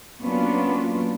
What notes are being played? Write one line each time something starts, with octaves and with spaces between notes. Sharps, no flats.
F#3 A#3 B3 C#4 D4 F4